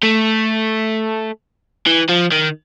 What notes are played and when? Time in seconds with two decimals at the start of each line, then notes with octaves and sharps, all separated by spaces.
0.03 A3
1.86 E3
2.09 F3
2.32 D#3